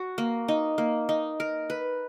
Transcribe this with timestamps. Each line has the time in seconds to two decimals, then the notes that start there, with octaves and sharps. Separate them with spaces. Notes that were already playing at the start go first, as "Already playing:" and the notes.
Already playing: F#4
0.18 A#3
0.48 D#4
0.78 A#3
1.09 D#4
1.40 A#4
1.70 B4